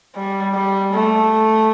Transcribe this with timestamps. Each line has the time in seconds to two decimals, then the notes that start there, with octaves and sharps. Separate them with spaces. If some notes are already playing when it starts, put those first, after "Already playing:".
0.16 G3
0.55 G3
0.93 A3